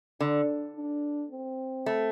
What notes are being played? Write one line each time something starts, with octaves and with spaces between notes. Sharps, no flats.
D3 D4
D4
C4
A3